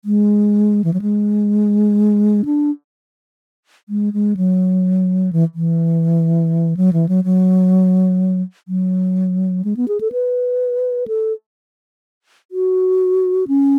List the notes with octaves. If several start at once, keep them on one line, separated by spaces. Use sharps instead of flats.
G#3
E3
F#3
G#3
D4
G#3
G#3
F#3
E3
E3
F#3
E3
F#3
F#3
F#3
G#3
B3
G#4
A4
B4
A4
F#4
C#4